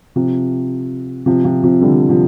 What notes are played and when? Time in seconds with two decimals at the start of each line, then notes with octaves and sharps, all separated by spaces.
0.16 C3 F3
1.26 C3 F3
1.44 C3 F3
1.63 C3 F3
1.81 D3 G3
2.09 C3 F3